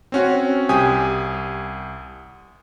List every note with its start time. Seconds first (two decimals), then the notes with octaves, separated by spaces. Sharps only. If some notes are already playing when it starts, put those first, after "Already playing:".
0.12 C4 C#4 F#4
0.69 C2 G4 G#5 D#6